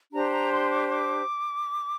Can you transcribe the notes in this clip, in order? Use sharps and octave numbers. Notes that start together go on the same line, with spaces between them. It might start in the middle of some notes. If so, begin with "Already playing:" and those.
D4 G4 C5 A#5
A#5
C6
D6
C6
D6